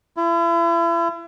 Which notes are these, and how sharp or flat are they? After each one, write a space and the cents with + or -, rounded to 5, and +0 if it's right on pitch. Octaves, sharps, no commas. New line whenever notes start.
E4 +40